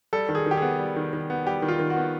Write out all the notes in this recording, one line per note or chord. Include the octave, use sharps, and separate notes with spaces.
G3 A4
D#3
G#4
D#3 G4
B3 G#4
G3
D#3
D#3
B3
G3 G4
D#3
F4
D#3
F#4
B3